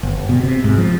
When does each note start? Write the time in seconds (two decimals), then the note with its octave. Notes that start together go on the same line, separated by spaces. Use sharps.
0.03 G1
0.29 B2
0.43 C3
0.64 G#2
0.77 F3